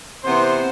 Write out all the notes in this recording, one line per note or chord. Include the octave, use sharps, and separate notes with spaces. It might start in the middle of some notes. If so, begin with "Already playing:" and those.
C3 E3 B3 C5